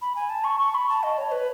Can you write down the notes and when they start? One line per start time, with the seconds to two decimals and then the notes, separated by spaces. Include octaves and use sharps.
0.02 B5
0.16 G#5
0.30 A5
0.44 C#6
0.60 C#6
0.75 B5
0.89 A5
1.03 D#5
1.18 C#5
1.32 B4